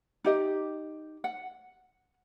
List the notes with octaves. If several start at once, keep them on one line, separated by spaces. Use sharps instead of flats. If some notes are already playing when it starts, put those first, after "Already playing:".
D#4 G4 D#5
F#5